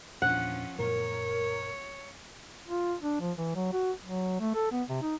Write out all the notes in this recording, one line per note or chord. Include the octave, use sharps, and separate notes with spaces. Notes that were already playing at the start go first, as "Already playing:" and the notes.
E2 A#2 F3 C#4 D4 F#5
F#2 A#2 A#4 C#5
F4
D4
F3
E3
F#3
F#4
F#3
A3
A4
B3
C3
D#4